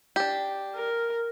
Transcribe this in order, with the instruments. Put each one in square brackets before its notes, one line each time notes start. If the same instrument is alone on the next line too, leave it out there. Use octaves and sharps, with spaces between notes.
[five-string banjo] D4 G4
[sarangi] A#4